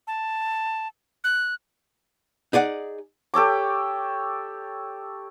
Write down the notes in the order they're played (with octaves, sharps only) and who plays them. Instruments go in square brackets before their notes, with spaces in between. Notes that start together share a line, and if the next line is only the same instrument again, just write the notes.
[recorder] A5
F#6
[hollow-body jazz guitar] D#4 G#4 D5 F#5
[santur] G4 A4 C#5 D6